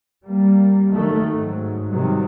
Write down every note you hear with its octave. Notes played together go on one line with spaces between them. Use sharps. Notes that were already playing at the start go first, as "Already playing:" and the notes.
G3 A#3
D#3 F#3 A3
G#2 F#3
C3 D#3 F#3 G3